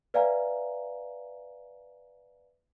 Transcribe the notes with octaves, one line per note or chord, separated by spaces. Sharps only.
B4 D5 E5 F5 G#5 A#5